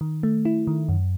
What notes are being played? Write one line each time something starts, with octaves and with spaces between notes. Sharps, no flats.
D#3
A3
E4
D#3
F#2